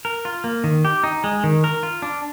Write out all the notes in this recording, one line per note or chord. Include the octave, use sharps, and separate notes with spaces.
A#4
F4
A#3
D#3
G4
D#4
G#3
D#3
A#4
F4
D4